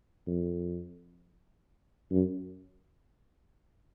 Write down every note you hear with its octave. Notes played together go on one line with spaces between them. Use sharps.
F2
F#2